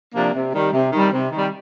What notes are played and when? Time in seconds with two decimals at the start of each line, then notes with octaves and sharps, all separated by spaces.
0.13 C3 F3 A#3 D4
0.33 C3
0.53 D#3 G3
0.73 C3
0.92 D#3 G3
1.12 C3
1.31 D#3 G3